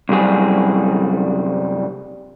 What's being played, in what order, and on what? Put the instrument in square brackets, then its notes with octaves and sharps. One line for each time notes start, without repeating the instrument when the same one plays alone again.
[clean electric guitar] C2 F#2 G3 G#4